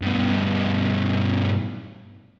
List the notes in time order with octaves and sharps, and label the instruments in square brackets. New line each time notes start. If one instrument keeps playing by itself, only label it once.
[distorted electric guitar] G2 B2